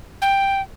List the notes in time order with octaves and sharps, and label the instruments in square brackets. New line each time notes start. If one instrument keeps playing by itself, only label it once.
[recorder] G5